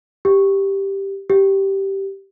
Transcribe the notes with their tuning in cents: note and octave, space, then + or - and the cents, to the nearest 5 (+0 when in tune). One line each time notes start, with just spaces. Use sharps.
G4 +0
G4 -10